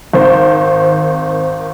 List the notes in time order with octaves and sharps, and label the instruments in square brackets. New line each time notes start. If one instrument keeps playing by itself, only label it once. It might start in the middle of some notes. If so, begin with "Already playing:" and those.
[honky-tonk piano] G#1 D#3 C4 C5